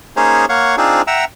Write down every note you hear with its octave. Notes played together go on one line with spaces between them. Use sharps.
A#3 C#4 D#4 G#4 C5 C#5
A#3 C#5 F5 F#5 C#6
C4 D4 D#4 F4 G#4 C5
E5 F#5 G5 A#5 E6